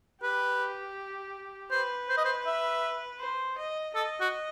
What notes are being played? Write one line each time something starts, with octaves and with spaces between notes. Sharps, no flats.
G4 B4
B4 C5
C5
D#5
C5
E5
C5
D#5
A4 D#5
F#4